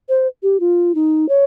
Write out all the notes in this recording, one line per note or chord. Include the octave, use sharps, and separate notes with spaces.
C5
G4
F4
D#4
C#5